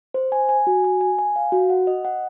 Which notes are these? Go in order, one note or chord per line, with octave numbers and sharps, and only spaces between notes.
C5
G#5
G#5
F#4
G#5
G#5
G#5
F5
F#4
F#5
D#5
F#5